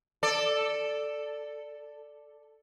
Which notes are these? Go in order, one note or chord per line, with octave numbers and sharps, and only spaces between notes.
A4 D5